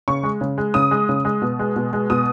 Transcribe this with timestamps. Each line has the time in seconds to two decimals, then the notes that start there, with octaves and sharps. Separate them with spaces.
0.08 C#3 C#6
0.23 G#3
0.41 C#3
0.58 G#3
0.74 C#3 D#6
0.91 G#3
1.09 C#3
1.25 G#3
1.42 B2
1.59 G#3
1.76 B2
1.93 G#3
2.10 B2 D#6